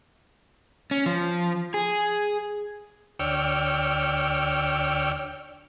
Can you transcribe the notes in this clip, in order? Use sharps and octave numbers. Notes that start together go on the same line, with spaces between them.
C#4
F3
G#4
D2 C#5 D5 G5 E6 F6